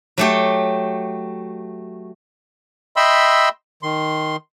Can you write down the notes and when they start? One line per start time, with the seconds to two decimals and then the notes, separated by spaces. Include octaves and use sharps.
0.18 F#3 A3 G4
2.96 D#5 E5 G5 B5 C6 E6
3.83 D#3 C6